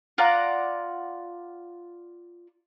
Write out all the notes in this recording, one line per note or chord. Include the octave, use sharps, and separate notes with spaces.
F4 D5 F#5 A#5